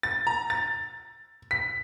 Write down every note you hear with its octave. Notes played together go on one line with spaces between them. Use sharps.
A6
A#5
A6
B6